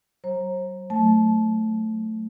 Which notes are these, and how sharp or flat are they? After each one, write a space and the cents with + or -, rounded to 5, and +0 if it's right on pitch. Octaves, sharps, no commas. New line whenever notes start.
F#3 +40 C5 +40 A#5 +0
F#3 +0 A3 +0 A5 -20